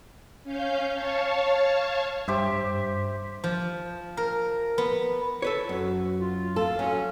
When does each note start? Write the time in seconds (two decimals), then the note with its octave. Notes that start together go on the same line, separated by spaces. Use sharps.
0.44 C#4 F5 G6
0.93 C#5 F5 A5 C#6
2.28 G2 G4 C5 E5
3.44 F3
4.17 A#4
4.78 B3
5.42 A4 B4 C#5
5.69 F#2 F#4
6.21 F4
6.56 A4 F5
6.79 F#3 C#4